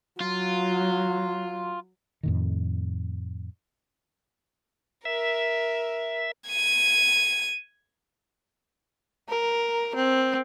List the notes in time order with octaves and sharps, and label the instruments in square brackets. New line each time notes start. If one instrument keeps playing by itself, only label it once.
[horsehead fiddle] F#3 [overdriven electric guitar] F4
[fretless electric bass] F2 A2 D#3
[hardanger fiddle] A#4 [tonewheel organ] E5
[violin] G#6 D#7
[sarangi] A#4
C4